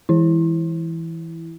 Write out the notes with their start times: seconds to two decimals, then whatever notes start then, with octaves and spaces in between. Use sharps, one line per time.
0.09 E3 E4